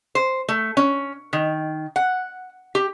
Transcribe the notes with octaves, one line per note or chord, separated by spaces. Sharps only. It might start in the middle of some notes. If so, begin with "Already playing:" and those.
C5
A3
C#4
D#3
F#5
G4